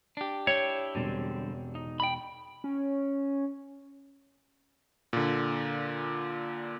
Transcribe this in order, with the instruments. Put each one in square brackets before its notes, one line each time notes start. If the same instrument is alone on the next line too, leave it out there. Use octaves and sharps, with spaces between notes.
[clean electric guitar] D4 G4
[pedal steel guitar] E4 G5 [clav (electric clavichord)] C#5
[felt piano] E1 [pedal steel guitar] D3 G3 C4
[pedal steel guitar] D#4
[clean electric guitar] G5 B5
[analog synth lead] C#4
[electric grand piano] A#2 D3